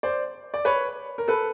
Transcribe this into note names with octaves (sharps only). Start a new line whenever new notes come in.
C5 D5
D5
B4 C#5
A#4
A4 B4